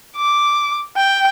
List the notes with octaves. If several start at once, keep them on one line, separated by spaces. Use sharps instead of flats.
D6
G5